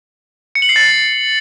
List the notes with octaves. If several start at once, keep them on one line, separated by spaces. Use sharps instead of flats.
C#7
F#7
C7
A6